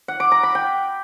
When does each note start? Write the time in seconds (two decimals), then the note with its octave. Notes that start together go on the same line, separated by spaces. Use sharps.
0.08 F#5
0.20 D6
0.32 A#5
0.43 B5
0.55 G5